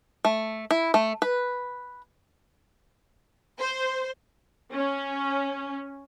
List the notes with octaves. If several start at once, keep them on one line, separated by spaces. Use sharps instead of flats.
A3
E4
A3
B4
C5
C#4